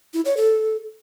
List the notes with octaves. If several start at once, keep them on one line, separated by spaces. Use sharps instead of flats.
E4
C#5
A4